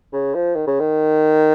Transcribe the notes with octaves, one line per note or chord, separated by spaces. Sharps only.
C#3
F3
D#3
C#3
D#3